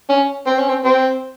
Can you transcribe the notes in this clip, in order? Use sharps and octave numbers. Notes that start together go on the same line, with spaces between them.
C#4
C4
C#4
C4
C4